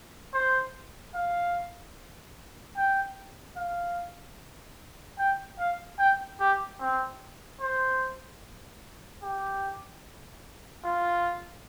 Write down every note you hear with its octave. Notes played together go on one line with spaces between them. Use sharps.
C5
F5
G5
F5
G5
F5
G5
G4
C4
C5
G4
F4